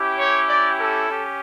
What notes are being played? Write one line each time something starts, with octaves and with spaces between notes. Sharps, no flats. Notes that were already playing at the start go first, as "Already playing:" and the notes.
Already playing: C#4 E4 G4
C#5
D5
A4
C#4 G4